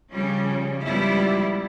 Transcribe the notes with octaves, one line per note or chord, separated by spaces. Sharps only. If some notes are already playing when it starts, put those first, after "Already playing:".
C#3 F3 G3 C#4
G#2 F3 G3 B3 E4